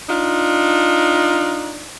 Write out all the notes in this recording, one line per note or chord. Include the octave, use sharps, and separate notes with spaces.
D4 D#4 F4